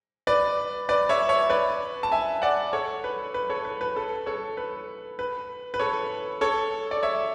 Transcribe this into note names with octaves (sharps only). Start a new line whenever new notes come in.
B4 D5
B4 D5
C#5 E5
C#5 E5
B4 D5
A5
E5 G#5
D5 F#5
A4 C#5
B4
B4
A4 C#5
B4
B4
A4
A4 C#5
B4
B4
B4
A4 C#5
A4 C#5
D5
C#5 E5